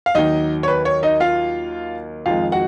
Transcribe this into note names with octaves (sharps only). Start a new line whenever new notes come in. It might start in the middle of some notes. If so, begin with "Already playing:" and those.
F5
D#2 D#3 F#3 D#4 D#5
C#5
B4
C#5
D#4 D#5
F4 F5
F2 D#3 G#3 F4 F5
F#4 F#5